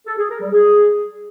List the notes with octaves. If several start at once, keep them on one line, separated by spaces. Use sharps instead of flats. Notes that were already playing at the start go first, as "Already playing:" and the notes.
A4
G#4
A#4
G3
G#4